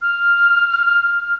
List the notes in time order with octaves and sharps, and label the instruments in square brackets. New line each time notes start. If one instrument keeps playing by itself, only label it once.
[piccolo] F6